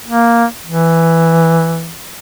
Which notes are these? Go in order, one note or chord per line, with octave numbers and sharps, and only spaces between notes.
A#3
E3